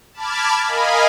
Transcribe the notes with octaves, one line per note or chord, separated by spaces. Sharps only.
A5 B5 D6 F6 G#6
A#4 D#5 F5 G#5 B5